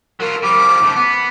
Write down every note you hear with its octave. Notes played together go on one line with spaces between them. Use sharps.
F#3 F4 A#4
F3 G3 D6
C#3 A3
B3